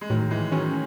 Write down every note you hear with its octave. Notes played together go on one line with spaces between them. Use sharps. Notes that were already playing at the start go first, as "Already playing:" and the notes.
G#3
A2 D#3 F#3
E3 G#3
D#3 F#3 C#4